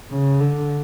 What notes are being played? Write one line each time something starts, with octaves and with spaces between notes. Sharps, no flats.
C#3
D3